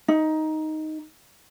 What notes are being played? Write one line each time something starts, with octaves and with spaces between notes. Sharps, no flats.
D#4